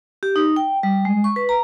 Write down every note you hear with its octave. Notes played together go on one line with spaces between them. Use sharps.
G4
D#4
G5
G3
G#3
C#6
B4
A#5